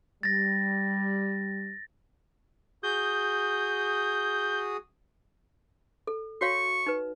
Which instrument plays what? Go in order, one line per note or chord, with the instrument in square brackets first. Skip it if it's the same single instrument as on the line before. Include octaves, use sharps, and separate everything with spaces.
[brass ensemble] G3 [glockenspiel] A6 A#6
[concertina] F#4 G#4 D#6 [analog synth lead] G6
[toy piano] A4
[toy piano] F#4 C#5 F5 [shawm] C#6
[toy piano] D#4 B4